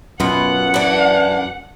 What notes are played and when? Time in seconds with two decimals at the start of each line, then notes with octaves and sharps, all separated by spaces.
0.20 F#2 B2 F4 F#5
0.74 E3 D4